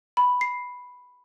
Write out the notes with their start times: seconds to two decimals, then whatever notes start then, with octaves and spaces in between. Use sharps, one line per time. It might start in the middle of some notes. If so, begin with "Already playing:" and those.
0.17 B5
0.41 C7